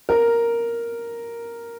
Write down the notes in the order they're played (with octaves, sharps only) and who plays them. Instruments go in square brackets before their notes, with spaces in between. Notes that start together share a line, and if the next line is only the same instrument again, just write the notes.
[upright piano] A#4